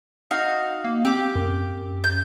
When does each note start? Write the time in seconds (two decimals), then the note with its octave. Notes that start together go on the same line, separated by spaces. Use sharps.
0.31 D#4 F#4 F5
0.84 A#3
1.05 C4 G4 D6
1.35 F#2
2.04 G6